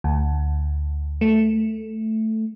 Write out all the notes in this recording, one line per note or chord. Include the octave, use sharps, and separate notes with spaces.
D2
A3